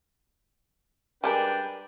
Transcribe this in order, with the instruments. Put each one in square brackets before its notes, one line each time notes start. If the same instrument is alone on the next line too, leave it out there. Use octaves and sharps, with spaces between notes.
[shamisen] G3 G#3 A#4 [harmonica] D4 B4 G5